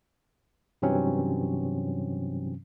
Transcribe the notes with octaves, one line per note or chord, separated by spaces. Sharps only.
G2 C3 E3 F#3 C4 C#4